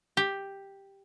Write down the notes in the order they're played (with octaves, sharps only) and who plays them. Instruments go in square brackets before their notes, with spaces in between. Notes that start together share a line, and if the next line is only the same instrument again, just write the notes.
[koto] G4